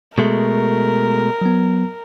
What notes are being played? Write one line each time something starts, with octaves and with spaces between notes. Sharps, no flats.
B2 G#3 A3 A#4
F#3 B3